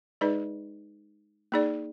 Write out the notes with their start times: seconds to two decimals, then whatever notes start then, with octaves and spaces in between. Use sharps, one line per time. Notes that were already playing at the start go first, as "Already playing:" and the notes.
0.21 G#3 D#4 G#4 B4 D5
1.52 A#3 D#4 G#4 D5